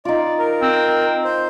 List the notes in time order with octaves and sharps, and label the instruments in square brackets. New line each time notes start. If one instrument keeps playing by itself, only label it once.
[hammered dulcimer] D#4 F4 [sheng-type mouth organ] D5
[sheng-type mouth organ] A#4
[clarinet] C4
[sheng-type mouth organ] C5